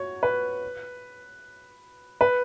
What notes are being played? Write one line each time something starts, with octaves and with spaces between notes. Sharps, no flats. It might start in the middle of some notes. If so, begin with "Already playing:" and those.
Already playing: F#4 C#5
B4
B4